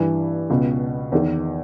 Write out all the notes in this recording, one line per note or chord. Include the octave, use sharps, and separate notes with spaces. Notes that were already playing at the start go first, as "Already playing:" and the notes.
Already playing: G2 E3
C#2 B2
E2 D#3